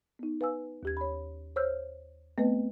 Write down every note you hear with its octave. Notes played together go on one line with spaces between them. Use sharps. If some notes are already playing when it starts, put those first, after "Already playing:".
B3 D#4
B4 F5 G#5 E6
D#2 G4 G#6
C#5 B5
C5 C#5 E6 F6 G6
A3 B3 C4 B4 D#5